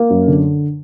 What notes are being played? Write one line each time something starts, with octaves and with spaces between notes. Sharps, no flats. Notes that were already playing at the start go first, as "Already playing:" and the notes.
Already playing: A#3
F#2
D3